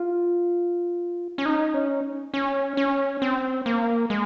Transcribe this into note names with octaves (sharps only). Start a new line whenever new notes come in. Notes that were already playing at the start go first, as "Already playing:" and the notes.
Already playing: F4
C#4
D#4
C#4
C#4
C#4
C4
A#3
G#3